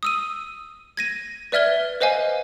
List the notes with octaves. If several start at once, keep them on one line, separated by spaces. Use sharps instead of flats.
D#6 E6 D#7
G#6 A#6 D#7
B4 D5 E5 F6 G#6 G7
B4 C5 D#5 F5 G#5